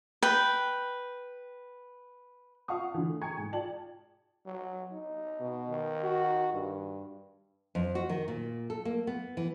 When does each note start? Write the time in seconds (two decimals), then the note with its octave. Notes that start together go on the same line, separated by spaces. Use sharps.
0.22 B4 G5
2.68 F4 F5 F#5 A5 C#6 D#6
2.94 D3 E3
3.09 A3
3.21 G5 G#5 A#5 C#6 G#6 C#7
3.37 G#2
3.53 F4 D5 G5 A5 F#7
4.46 F#3
4.92 D#4
5.41 B2
5.69 D#3
6.04 F#4
6.54 G2
7.75 F2
7.95 F#4
8.09 D#3
8.28 A#2
8.70 A4
8.85 A#3
9.07 B3
9.37 E3